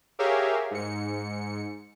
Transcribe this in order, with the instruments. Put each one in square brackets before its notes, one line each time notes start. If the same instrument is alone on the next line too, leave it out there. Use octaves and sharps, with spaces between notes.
[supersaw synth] G4 G#4 A#4 C#5 E5 F5
G#2 C#7